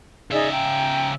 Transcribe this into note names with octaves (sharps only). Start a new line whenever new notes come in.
C#3 D#4 G#4 D5 E5
G5 A#5